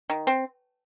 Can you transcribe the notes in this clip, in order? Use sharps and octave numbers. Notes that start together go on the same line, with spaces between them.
D#3
C4